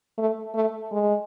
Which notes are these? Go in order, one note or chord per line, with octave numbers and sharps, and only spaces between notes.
A3
A3
G#3